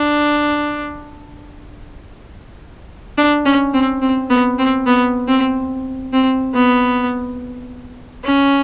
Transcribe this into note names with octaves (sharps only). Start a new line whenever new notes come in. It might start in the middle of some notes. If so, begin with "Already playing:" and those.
Already playing: D4
D4
C#4
C4
C4
B3
C4
B3
C4
C4
B3
C#4